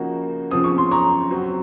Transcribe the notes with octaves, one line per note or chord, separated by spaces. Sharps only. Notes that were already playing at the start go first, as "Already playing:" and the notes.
Already playing: C#3 F3 A#3 D#4 F#4
C#3 F3 C4 D#6
C#6
C6
A#5 C#6
F#3 C4 F#4